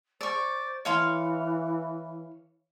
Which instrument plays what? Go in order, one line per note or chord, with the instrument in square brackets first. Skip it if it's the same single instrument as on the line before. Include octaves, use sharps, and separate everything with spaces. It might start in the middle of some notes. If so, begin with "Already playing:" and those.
[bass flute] C5 [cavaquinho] D5 C#6
[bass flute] E3 [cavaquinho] C#5 F5 C6